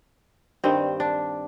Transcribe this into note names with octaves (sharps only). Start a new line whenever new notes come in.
G2 D#3 G3 C4
D4